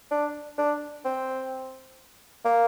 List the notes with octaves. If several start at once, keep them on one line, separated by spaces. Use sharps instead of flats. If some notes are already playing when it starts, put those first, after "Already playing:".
D4
D4
C4
A#3